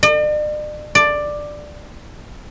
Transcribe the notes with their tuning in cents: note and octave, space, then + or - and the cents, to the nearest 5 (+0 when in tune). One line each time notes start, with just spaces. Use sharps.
D5 +45
D5 +10